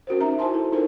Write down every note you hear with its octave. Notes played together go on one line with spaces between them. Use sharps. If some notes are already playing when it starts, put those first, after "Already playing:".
C#4 F#4 A#4 C5
C#4 D#4 E5 A#5
E4 C5 G#5 A5 C6
A4
D#4 F4 A4 A#4 C5